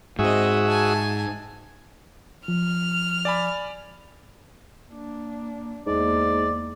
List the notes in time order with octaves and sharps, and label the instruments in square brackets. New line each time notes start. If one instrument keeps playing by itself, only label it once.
[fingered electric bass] G#2 [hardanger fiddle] C4 D#5 [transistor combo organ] F#4 G#4 E5
[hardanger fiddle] G#5 A5
[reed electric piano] F3 [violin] F6
[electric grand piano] D5 G#5 B5
[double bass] A#3 D4
[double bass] E2 A#3 [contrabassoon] G#2 [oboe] D5